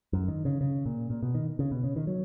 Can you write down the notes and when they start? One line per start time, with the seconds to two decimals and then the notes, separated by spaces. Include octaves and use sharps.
0.13 F#2
0.28 D#3
0.45 C#3
0.61 C#3
0.86 A#2
1.10 A#2
1.23 B2
1.35 D#3
1.59 C#3
1.71 B2
1.84 C#3
1.96 D#3
2.07 F#3